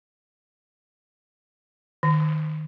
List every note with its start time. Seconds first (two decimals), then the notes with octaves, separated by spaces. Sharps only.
2.03 D#3